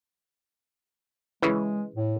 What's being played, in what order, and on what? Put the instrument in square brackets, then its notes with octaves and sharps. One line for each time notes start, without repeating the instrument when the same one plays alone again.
[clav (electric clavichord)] C#3 E3 [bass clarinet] G#3
[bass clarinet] A2